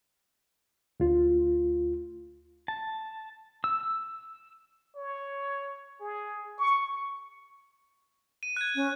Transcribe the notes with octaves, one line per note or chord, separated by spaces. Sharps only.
D2 F4
A5
E6
C#5
G#4
C#6
D#7
F#6 G#6
C#4